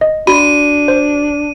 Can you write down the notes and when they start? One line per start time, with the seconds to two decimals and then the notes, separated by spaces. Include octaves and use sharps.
0.01 D#5
0.27 D4 F#4 B5 D#7
0.88 C5